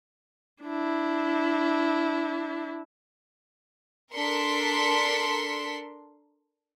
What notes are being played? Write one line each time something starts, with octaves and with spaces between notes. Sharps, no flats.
D4 E4
D4 A4 A#4 C6 B6 C#7